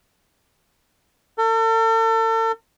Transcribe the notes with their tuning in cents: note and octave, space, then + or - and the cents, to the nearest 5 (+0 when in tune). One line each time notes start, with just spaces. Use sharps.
A4 +40